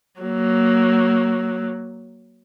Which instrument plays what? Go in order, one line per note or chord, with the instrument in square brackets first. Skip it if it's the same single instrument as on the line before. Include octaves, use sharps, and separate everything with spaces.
[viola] F#3 A#3